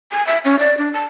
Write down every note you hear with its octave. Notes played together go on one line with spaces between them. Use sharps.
G#5
E5
C#4
D5
D4
A5